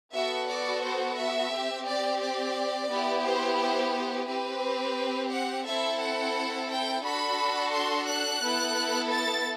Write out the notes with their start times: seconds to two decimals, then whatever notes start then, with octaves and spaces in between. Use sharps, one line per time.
0.13 B3 F#4 A4 E5
0.49 D5
0.83 C5
1.17 E5
1.52 C4 G4
1.86 D5
2.21 D5
2.90 B3 E4 G4
3.24 C5
3.59 C5
3.93 C5
4.28 C4 G4 B4
5.32 F#5
5.66 C4 E4 A4 E5
6.01 F#5
6.69 G5
7.04 D4 F#4 A4 B5
7.73 C6
8.08 F#6
8.42 B3 E4 A4
9.12 A6